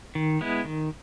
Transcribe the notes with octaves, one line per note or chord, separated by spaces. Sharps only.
D#3
G#3 B3 E4
D#3